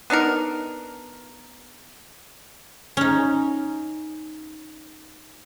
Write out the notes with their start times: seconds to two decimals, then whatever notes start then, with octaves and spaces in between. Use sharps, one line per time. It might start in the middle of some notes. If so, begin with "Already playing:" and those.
0.10 B3 D4 D#4 A#4
2.97 C#4 D#4